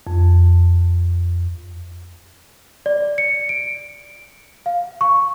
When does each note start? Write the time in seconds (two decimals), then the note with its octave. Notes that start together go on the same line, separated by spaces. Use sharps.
0.07 F2
2.86 D5
3.18 C#7
3.49 D7
4.66 F5
5.01 C#6